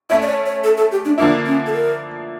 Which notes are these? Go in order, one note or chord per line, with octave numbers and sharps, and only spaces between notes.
A3 C#4 E4 E5
D5
C#5
C#5
A4
A4
G4
D4
D3 F3 A#3 D4 E4
C#4
A4
A#4